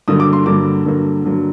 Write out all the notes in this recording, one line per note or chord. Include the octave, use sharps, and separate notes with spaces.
G2 D3 F#3 A#3 D#6
D6
C6
G2 D3 F#3 A#3 D6
G2 D3 F#3 A#3
G2 D3 F#3 A#3